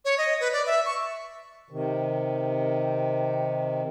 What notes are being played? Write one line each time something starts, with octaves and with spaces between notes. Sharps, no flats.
C#5
D#5
B4
D5
E5
C#6
C3 D#3